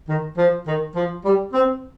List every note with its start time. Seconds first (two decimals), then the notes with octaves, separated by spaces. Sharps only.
0.09 D#3
0.38 F3
0.66 D#3
0.96 F3
1.25 G3
1.53 C4